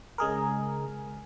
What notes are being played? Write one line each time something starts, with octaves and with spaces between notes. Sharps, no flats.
C#3 G#3 G#4 A#4